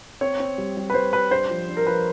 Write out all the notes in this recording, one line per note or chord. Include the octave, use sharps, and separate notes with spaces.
C4 C#5
C4
G3
G3
B4
G3 C5
G3 B4
D4 C5
F3
D4
A#4
F3 B4